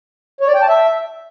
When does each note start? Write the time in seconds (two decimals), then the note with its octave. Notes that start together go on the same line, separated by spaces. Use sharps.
0.41 C#5
0.48 D5
0.55 G5
0.62 A5
0.69 E5